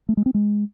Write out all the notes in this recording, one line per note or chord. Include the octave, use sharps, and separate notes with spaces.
A3
G#3
C4
G#3